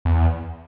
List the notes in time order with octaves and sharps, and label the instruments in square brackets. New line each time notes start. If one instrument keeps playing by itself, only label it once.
[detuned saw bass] E2